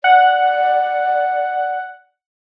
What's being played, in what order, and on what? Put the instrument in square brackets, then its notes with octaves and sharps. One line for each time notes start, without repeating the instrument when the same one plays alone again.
[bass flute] D5 [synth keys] F#5